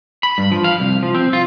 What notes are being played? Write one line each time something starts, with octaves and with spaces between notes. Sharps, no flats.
B5
G2
F3
F5
C2
F3
C4
F4